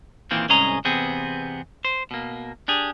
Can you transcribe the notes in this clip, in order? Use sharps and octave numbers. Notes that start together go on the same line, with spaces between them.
A#2 D#3 E3 A#3 C4
C2 G#2 C#4 G#4 D#5 A#5
E2 C3 B3 C4 G#4
C5
B2 A#3
D4 G4 G#4